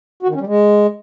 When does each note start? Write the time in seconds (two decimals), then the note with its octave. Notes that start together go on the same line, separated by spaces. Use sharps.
0.23 F#4
0.29 D#3
0.35 C#4
0.41 G3
0.47 G#3